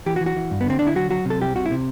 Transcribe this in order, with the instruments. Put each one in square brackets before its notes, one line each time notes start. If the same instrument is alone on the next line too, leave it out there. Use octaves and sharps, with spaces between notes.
[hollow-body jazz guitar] E3 G4
F#4
E3
F#4
E3
G2
B3
D3 C4
D3 D4
E4
F#3 F#4
F#3 F#4
C3 A4
C2 G4
C3 F#4
E4
C3